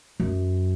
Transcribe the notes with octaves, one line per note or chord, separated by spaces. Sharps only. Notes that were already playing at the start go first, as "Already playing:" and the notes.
F#2